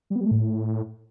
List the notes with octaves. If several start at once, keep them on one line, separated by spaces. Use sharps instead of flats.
G3
B3
G3
A3
A2